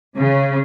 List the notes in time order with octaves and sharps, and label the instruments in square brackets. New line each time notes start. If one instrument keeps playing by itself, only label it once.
[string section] C#3